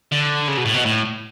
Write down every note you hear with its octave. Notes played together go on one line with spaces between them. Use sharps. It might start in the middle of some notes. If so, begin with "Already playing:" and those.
D3
C#3
B2
A2
B2
A2